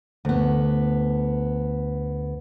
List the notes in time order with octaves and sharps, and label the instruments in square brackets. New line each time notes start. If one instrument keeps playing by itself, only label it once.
[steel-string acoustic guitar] D2 B3